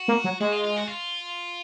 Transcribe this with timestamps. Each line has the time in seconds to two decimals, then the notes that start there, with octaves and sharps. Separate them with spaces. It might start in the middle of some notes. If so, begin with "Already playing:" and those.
Already playing: F#4
0.08 A#3
0.24 F#3
0.40 G#3 F#4
0.52 F4
0.64 F4
0.76 F#4
0.88 F4